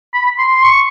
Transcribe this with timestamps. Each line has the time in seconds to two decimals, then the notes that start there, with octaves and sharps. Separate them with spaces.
0.13 B5
0.38 C6
0.55 C6
0.63 C#6